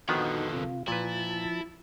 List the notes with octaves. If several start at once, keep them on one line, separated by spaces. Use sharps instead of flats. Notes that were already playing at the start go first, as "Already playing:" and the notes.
F2 D3 D#3 F3 B3 D#4 F#4
C3 F4
A#2 F3 E4 B4 A5